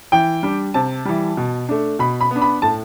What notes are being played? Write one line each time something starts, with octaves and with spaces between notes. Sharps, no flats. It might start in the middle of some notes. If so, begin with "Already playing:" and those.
E3 G5
G3 D4
C3 A5
E3 G3
B2
A3 D4
B2 B5
B5
B3
D4
B5
A2 A5